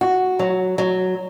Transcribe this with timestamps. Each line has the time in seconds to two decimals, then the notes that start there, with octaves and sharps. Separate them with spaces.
0.01 F#4
0.39 F#3
0.78 F#3